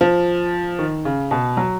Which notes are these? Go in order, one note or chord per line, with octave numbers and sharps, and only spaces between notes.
F3
D#3
C#3
B2
F#3